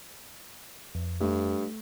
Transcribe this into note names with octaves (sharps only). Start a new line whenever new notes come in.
F2
G2 A3